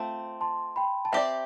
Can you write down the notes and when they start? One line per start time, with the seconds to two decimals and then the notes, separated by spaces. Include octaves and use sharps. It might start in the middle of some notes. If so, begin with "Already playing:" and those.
Already playing: A3 C4 F4 C5
0.41 A5 C6
0.76 G5 B5
1.05 A5
1.12 C4 G4 D5 E5 G5